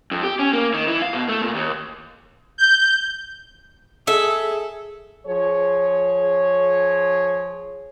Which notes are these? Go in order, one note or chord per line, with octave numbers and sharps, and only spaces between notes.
F2
G4
C#4
A#3
D#3
E3
F5
B2
A3
A#2
D#2
G6
G#4 A4 E5
F3 G#4 C#5